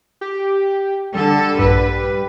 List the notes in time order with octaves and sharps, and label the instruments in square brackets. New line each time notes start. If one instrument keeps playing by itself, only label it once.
[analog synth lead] G4
[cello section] D3 A4 [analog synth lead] G3
[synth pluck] A#1 G2 [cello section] B4